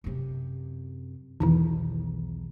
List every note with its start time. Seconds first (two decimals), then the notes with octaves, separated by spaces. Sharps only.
0.04 F#2 C3
1.40 B1 E2 D#3 E3